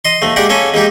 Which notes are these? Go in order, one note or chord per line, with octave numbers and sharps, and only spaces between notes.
D#5 C6
D#2 A3
G#3 A#3 G4 D5 F#5
A#3 C#4 A4 G#5
G#3 A#3 D#4 G4